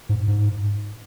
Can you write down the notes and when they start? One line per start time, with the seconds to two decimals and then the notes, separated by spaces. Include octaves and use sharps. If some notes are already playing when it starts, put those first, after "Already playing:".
0.09 G#2
0.28 G#2